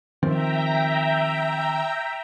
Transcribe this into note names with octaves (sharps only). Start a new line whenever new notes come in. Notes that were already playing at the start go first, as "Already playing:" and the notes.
D#3 F3 C4 E5 G5 A#5